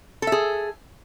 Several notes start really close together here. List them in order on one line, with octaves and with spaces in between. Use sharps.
A4 E5 G#4